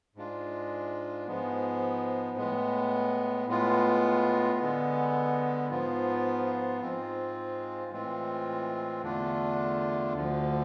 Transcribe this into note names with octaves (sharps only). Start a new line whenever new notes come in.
G#2 G#3 D4 F4
G#2 F3 G#3 B3
A2 G#3 B3
A2 G#3 B3 F4
D3 G#3 B3
G#2 F3 B3 F4
G#2 G#3 C4 F4
A2 E3 G#3 C4 F4
E2 D3 A3 D4 F4
D2 D3 F3